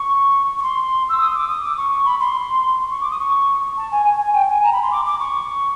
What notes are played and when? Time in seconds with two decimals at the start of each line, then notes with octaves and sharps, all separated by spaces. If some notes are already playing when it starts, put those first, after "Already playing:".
Already playing: C#6
0.58 C#6
0.63 C6
1.09 E6
1.21 D#6
1.35 D6
1.49 D#6
1.63 D6
1.77 C#6
1.92 C#6
2.05 B5
2.20 C6
2.91 C#6
3.01 D6
3.11 D#6
3.19 C#6
3.77 A5
3.92 G#5
4.05 G#5
4.20 G#5
4.34 G5
4.48 G#5
4.63 A#5
4.72 B5
4.83 C6
4.91 D6
5.06 D6
5.20 C#6